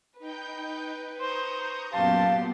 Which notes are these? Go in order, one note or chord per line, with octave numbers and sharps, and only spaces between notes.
D#4 B4 G5 G6
C5 A#5 C#6 D#6
F#2 A#2 B3 G4 F5 A5 C6